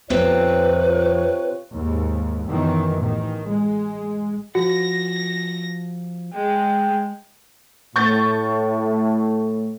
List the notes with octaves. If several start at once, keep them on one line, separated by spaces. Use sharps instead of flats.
F2 C3 C4 F4 B4 C#5
D#2 G#2
F#2 B2 D#3 E3
A1 D#3
G#3
F3 F#4 F#5 A#6
G#3 G5
A2 C#6 G6 A6